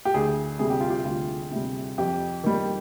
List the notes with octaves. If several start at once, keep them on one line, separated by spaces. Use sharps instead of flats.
G4
D2 G#4
C3 G3 G#4
G4
F4
G4
D2 F4
C3 G3
F2 G4
D#3 G3